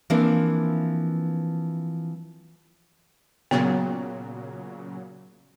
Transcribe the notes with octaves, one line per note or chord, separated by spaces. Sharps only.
E3 F3 A#3 C4 D4
A#2 C#3 F#3 B3